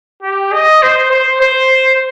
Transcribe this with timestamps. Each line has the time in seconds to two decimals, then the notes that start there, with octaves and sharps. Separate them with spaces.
0.22 G4
0.52 D#5
0.82 C5
1.11 C5
1.41 C5